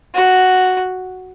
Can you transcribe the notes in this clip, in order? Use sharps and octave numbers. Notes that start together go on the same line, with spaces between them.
F#4